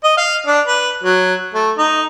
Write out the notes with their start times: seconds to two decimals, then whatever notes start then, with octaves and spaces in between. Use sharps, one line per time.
0.04 D#5
0.17 F5
0.46 D4
0.67 B4
1.03 F#3
1.54 A3
1.78 D#4